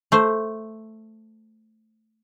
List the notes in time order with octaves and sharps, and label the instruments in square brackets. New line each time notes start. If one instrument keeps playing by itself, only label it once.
[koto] A3 C5